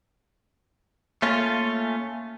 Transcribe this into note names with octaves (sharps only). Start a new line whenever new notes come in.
A3 A#3 C#4 F4